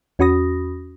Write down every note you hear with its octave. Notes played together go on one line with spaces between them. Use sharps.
E2 C#4 F#4 B5 D#6 A#6